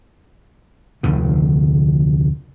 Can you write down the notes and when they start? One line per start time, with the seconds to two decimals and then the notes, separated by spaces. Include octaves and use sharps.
1.03 F1 D2 D3 D#3